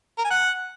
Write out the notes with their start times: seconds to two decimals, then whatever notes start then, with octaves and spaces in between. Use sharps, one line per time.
0.18 A#4
0.24 G#5
0.30 F#5